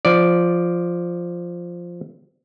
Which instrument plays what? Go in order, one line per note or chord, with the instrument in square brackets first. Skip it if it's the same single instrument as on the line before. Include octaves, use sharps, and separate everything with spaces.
[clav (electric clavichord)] F3 D5